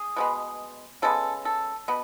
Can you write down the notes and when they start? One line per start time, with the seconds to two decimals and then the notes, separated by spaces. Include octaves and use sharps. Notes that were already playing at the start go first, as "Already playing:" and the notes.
Already playing: G#4
0.16 B2 G#3 B3
1.02 C#3 G#3 B3 A4
1.45 A4
1.88 B2 B3